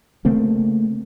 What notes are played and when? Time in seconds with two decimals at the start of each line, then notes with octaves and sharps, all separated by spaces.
0.25 C#3 A3 A#3 C4